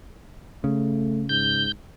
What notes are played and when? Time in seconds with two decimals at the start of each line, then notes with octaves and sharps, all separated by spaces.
0.64 C#3 A3
1.29 G#2 G6